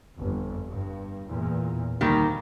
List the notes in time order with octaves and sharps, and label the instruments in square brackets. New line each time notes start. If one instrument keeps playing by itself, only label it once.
[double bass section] G1 F2
G2
E2 A#2
[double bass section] D2 [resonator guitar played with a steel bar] D#3 G3 A#3